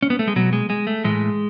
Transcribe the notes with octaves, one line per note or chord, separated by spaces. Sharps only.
C#4
B3
A3
G#3
B2 F#3
G#3
G#3
A3
A2 E3 G#3